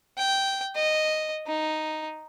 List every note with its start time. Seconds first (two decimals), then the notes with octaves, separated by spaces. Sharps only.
0.18 G5
0.76 D#5
1.47 D#4